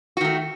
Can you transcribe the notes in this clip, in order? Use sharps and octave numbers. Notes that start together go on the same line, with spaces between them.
D#3 A3 F#4